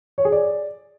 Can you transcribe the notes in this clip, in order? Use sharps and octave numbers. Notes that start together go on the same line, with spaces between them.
C#5
G#4
D5